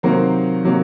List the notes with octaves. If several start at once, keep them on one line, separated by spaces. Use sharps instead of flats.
C3 D#3 F#3 A#3 C5
C3 D#3 F#3 A#3